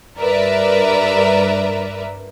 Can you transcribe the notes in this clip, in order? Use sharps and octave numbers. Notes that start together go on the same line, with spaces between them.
G2 A#4 B4 D5 E5